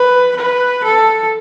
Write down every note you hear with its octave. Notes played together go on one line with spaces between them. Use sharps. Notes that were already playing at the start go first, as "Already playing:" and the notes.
Already playing: B4
B4
A4